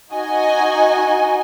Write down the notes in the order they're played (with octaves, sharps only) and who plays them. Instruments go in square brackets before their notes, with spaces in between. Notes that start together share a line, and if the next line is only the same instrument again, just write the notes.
[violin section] D#4 F#4 D#5 G#5